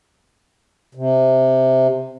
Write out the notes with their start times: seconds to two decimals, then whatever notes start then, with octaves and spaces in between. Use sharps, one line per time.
0.95 C3